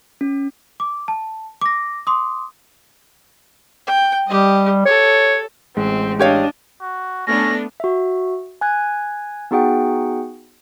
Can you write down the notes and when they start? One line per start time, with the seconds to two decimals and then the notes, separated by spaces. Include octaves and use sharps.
0.21 C#4
0.80 D6
1.08 A5
1.61 D6 A#6
2.07 C6 D6 D#6
3.87 G5
4.28 G3 G4 D#5
4.86 A4 C#5
5.77 A1 G#3 C4
6.19 D4 G4 C#5 D#5 F5
6.81 F#4
7.27 A3 B3 C#4 D4 A#6
7.80 F#4 E5
8.61 G#5 F#6 G#6
9.51 B3 D#4 F#4 G#4 F#5 G5